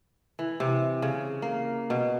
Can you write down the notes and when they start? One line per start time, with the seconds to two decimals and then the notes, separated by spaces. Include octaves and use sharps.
0.39 E3
0.60 C3
1.02 C#3
1.42 A#3
1.90 B2